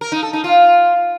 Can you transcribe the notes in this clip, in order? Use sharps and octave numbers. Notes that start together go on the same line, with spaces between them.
A#4
D#4
A4
D#4
F4